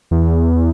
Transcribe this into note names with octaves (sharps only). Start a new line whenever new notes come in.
E2